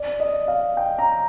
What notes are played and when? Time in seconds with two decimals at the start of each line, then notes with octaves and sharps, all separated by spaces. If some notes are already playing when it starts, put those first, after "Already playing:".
Already playing: D5
0.20 D#5
0.48 F5
0.77 G5
0.99 A#5